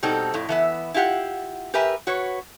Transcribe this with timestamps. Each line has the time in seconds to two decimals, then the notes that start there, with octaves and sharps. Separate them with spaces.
0.03 B2 G3 C4 D#4 A4
0.34 F2 A2
0.49 E3 B3 E5
0.94 E4 F4 G4 F#5
1.74 G4 A#4 B4 E5 G#5
2.07 F#4 B4 C#5